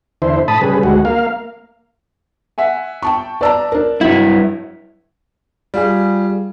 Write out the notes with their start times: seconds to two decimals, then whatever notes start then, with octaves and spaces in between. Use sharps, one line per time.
0.22 E2 D3 E4 C5
0.48 A2 A5 B5 D#6
0.61 C#3 G3 G#4 B4
0.83 D2 G#3 F#4
1.05 A#3 F5
2.58 E5 F#5 G#5
3.02 G5 A5 C#6
3.41 B4 D5 A5 A#5 E6
3.72 D4 A#4
4.01 G2 F#3 E4
5.74 G3 F4 G#4